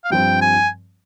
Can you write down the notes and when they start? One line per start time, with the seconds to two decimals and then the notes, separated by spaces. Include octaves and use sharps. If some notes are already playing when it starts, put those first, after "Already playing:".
0.05 F5
0.10 G2 F3 C4 G5
0.41 G#5